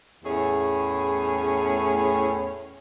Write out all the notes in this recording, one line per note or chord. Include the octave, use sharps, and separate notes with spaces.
E2 A2 A3 C#4 G#4